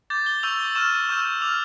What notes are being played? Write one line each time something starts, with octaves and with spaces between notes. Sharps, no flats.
D6 G6 A6
G7
C#6 E6 G6 F7
G7
C#6 F6 E7
C#6 E6 G6
D6 F6 F7